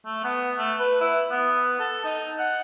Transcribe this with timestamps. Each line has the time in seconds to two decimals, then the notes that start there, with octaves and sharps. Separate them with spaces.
0.05 A3
0.24 B3
0.59 A3
0.80 B4
1.01 E4
1.31 B3
1.80 A4
2.05 D#4
2.39 F#5